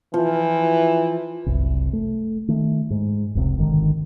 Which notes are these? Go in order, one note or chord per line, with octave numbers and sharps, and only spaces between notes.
E3 F3
F#1 C2
A3
D#3 A3
G#2
F1 C#2 A2 C3
G#1 G#2 D3 D#3